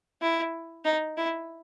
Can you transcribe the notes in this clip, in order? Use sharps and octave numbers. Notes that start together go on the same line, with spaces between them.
E4
D#4
E4